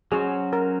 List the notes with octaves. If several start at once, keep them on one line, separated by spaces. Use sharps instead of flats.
F#3 C#4 F#4 G#4 C5
A#4